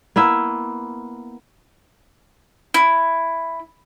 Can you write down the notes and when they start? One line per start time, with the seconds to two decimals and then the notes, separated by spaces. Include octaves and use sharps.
0.16 A#3 B3 E4 E5
2.74 E4